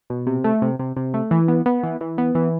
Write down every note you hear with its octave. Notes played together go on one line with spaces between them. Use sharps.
B2
C3
A3
C3
C3
C3
A3
E3
B3
B3
E3
E3
B3
E3